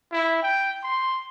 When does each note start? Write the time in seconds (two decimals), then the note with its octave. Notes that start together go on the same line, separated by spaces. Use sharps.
0.12 E4
0.42 G5
0.83 C6